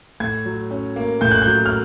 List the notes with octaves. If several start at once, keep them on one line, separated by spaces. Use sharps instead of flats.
A2 G#6
F#3
C#4
A#3
A2 G6
F#6
G6
F#3
F6